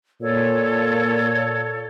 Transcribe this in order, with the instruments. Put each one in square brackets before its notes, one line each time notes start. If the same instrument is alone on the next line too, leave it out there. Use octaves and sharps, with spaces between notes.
[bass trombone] A#2 [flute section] A4 C#5